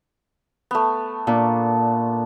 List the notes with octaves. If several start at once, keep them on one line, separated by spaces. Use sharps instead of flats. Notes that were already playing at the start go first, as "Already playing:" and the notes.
A3 B3
A#2 D4